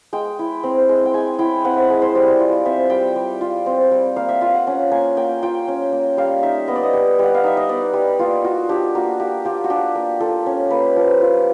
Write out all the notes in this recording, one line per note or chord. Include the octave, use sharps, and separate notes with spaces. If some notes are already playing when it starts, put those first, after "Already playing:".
G#3 G5
E4
C4
G#3
G5
G#3 G#5
E4 G5
C4 F#5
E5
G#3
C5
G3 D5
F4
C4 E5
G3 G5
G3
F4
C4
G3
A#3 F5
E5
F4 F5
F#5
C#4
A#3 G#5
A#3 G5
F4 G5
C#4
A#3
G3 F5
D#4 E5
B3 D#5
D5
D#5
G3
G3 F#5
F5
D#4 E5
D#5
B3 D5
G3
A#3 F4
F4 F#4
D4 G4
A#3 F#4
A#3 G4
F4 G4
F#4
D4 G4
A#3
F4 A4
C#4
A#3 B4
F3
F4